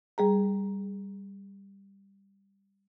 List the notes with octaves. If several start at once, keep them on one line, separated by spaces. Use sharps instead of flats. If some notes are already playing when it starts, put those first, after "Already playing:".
G3 G#4 A#5